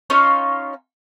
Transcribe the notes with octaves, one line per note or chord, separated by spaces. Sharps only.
C#4 D#4 F4 C#5